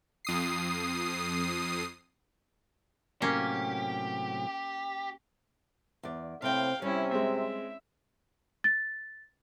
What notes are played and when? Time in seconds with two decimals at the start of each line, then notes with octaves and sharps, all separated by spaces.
0.25 F2 D#6 C7
3.22 A2 C3 F#3 A#3 C#4 G4
6.03 E2 D5
6.42 A2 C3 C4 F5 G5
6.82 C3 G3 C#4 E4
7.11 G#3 C4 E5
8.64 A6